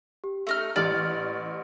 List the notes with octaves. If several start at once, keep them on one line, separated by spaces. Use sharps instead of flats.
G4
A3 D#4 F6
A1 G4 D5 F6 A6